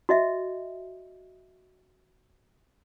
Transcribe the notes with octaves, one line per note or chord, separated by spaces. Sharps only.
F#4 D#5 E5